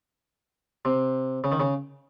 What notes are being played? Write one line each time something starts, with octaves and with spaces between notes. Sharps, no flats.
C3
C#3
D#3
C#3